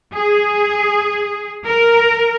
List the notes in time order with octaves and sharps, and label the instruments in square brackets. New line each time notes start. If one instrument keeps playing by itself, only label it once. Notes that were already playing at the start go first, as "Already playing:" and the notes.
[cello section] G#4
A#4